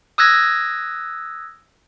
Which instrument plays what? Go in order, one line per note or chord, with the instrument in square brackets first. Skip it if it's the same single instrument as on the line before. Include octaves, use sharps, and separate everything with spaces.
[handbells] D#6 E6 F#6 G#6 A#6